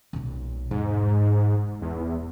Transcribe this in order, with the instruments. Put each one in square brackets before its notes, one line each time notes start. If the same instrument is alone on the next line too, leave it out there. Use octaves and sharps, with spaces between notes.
[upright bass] B1 A#2
[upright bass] E1 [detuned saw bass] G#2
[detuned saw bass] E2